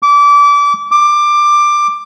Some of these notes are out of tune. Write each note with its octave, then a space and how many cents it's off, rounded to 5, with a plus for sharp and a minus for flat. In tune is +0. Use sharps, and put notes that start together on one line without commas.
D6 -25
D6 +15